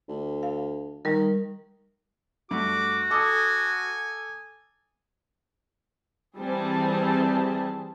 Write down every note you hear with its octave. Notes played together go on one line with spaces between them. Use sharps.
D2
F5
D#3 G3 A#4
G2 A3 F#4 D6
A4 G#5 D6 D#6
E3 G3 C4 G#4 A5